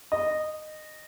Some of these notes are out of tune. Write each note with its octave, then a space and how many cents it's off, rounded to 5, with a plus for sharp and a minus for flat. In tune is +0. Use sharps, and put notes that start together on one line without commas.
D#5 -15